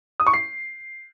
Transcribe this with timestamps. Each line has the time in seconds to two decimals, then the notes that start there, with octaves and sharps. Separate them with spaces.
0.20 D#6
0.27 C#6
0.34 C7